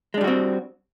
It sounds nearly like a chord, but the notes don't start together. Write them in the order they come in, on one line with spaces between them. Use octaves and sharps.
G#3 D4 G3 F#4 C4